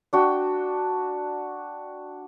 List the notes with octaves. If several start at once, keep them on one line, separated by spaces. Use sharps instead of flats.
D4 F#4 G5